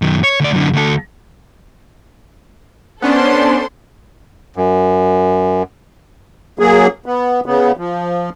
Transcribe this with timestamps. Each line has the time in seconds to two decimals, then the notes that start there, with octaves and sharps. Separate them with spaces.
0.02 F#2 D#3
0.23 C#5
0.40 D2 D5
0.53 F#2 D3
0.73 D2 A4
3.02 B3 C#4 D4 A4 C5 C6
4.56 F#2
6.59 F#3 A#3 G#4
7.06 B3
7.46 C#3 B3
7.77 F3